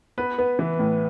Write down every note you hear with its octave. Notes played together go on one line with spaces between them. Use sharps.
B3 B4
B3
E3
A2